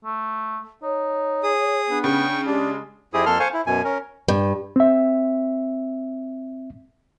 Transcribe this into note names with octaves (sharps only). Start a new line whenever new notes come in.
A3
D#4 C#5
G#4 D#6
B3 D4
C#3 G5 C#6
G#3 D4 G4
F2 C4 E4 G4 G#4 D#6
F2 A#3 A4 A5 C6 F6
C5 F5 G#5 C#6
E4
F#2 B2 G#5
C#4 A#4
G2
C4 E5